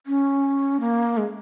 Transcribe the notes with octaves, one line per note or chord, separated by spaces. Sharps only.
C#4
A#3
G#3